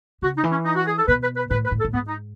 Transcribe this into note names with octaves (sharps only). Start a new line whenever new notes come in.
C#3 F#4
D#4
E3
C#4
D#4
F#4
G#4
A4
B2 B4
B4
B4
A2 B4
B4
A2
A4
A2
G#2 B3
D#4